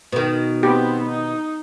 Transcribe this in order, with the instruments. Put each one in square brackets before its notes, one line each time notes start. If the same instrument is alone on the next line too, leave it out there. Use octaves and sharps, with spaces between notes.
[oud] B2 D#3
[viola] B3 C4 [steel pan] G4
[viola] D#4